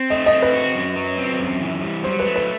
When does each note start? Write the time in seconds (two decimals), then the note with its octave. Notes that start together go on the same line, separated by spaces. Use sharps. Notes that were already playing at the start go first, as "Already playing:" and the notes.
Already playing: C4
0.10 A3 D#5
0.26 D#5
0.32 C4
0.42 B4
0.54 F#4
0.75 F#2
0.96 F#3
1.18 C4
1.40 F#2
1.61 E3
1.82 G3
2.04 F#3 C5
2.20 B4
2.26 A3
2.36 B4